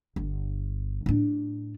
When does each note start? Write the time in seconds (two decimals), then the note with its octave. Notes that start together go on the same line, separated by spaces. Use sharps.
0.16 G1
1.06 A2 D4